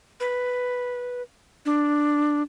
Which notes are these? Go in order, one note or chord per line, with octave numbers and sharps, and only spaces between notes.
B4
D4